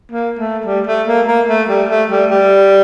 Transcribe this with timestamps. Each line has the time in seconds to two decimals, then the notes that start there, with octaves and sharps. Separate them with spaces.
0.12 A#3
0.39 A3
0.66 G3
0.87 A3
1.08 A#3
1.28 A#3
1.48 A3
1.69 G3
1.90 A3
2.11 G3
2.31 G3